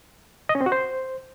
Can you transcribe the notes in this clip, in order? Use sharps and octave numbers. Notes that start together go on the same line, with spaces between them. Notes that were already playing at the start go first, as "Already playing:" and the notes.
D#5
C#4
C4
F#4
C5